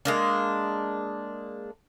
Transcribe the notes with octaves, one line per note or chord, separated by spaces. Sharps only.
G#3 A#3 D4